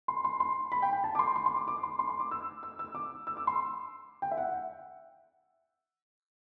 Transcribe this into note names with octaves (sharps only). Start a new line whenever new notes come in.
C6
C6
C6
B5
G5
G5
A5
D6
C6
C6
C6
D6
D6
C6
C6
C6
D6
E6
E6
E6
D6
E6
D6
C6
G5
E5
F#5